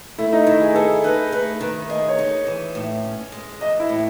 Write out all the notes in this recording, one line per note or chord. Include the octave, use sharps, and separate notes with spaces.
A3 E4
D#4
D#3 E4
G#4
G#4 A4
D#4 B4
A3 B4
D#3 B4
G#4 D#5
C#5
D#4
E3
A2
C#4
G#3
E3 D#5
E4
A2